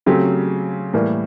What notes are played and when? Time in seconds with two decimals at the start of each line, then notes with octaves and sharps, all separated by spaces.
0.06 C#3 F#3 A3 C4 G4
0.94 A2 E3 G3 A#3